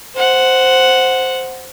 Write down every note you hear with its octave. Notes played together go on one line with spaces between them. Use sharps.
C5 F#5